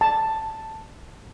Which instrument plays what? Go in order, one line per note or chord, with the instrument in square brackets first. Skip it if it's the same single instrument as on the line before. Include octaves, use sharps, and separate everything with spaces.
[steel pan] A5